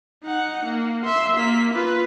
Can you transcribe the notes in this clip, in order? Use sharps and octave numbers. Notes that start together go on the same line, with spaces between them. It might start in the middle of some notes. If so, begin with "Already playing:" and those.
D#4 F#5
A#3
E5 C6
A#3 B6
F4 B4